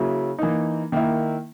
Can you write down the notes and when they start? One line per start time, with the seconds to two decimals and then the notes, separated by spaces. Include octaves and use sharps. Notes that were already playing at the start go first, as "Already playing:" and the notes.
Already playing: C#3 F#3 A#3 E4
0.39 E3 A#3 D#4
0.92 D#3 A#3 E4